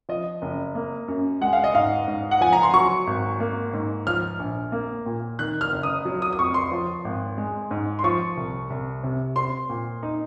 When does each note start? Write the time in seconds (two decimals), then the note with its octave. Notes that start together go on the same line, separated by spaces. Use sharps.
0.09 F3 D#5
0.42 F#1
0.75 A#3
1.08 F#2
1.41 G#3 F#5
1.53 F5
1.64 D#5
1.74 G#2 F5
2.08 G#2
2.31 F#5
2.41 F3 G#5
2.53 A#5
2.63 C6
2.73 F#3 C#6
3.07 G#1
3.40 A#3
3.73 G#2
4.07 F3 F6
4.40 A#1
4.72 A#3
5.06 A#2
5.39 D#3 F#6
5.61 F6
5.72 F#1
5.83 D#6
6.05 F#3
6.22 D#6
6.33 D#6
6.38 F2 C#6
6.54 C6
6.72 F3
7.05 G#1
7.38 G#3
7.71 G#2
7.99 C6
8.04 F3 C#6
8.37 C2
8.70 C2
9.03 C3
9.36 C4 C6
9.69 A#2
10.03 D#4